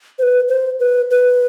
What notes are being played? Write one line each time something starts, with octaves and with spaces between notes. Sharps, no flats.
C5
B4
C5
B4
B4